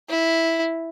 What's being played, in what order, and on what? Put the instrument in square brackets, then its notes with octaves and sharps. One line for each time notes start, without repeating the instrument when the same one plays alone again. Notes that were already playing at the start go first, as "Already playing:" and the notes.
[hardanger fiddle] E4